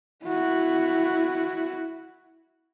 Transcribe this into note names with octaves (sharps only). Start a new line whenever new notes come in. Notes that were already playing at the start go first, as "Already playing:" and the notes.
E4 F#4